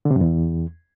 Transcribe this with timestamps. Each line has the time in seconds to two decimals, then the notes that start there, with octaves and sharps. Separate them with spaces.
0.05 D3
0.11 C3
0.16 F#2
0.21 E2